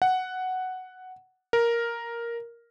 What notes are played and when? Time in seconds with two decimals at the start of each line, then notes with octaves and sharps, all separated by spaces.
0.02 F#5
1.53 A#4